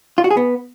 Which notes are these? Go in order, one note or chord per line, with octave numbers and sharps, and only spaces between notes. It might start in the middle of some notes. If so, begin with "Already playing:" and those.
F4
F#4
G#4
B3